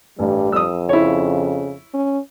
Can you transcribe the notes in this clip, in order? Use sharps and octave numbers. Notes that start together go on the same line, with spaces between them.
A1 G2 G3
F2 D#6 E6
C#3 E4 C#5
C#4